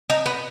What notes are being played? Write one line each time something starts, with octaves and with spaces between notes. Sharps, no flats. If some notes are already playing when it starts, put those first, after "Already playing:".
D#4
B3